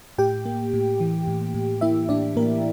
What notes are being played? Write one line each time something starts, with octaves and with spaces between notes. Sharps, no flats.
A2 G4 G5
A#3
A2
E3
A2
A2
A#3 E4 E5
A2 D4 D5
A2 A#3 A#4